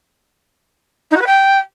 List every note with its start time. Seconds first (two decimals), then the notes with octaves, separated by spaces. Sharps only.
1.11 D#4
1.16 F#4
1.21 B4
1.26 G5